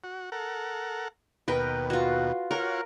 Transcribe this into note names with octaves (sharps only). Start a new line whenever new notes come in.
F#4
A4 A#4 F#5
D#2 B2 A#4 B4 G5
F4 F#4
F4 F#4 A#4 C#5